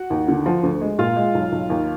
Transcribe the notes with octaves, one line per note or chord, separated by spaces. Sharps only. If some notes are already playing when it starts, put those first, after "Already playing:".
Already playing: F#4 F#5
D#2
D3
F3
D2
G#3
A#2 F4 F5
G#3
B1
B1
D#2